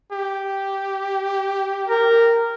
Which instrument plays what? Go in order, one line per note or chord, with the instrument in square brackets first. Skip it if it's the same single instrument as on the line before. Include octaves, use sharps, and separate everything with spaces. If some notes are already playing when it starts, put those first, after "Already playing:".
[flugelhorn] G4
[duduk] A#4